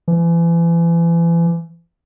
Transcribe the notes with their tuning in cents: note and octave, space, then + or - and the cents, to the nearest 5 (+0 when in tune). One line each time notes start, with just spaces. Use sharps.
E3 +35